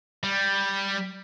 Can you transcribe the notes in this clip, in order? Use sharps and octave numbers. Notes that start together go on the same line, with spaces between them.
G3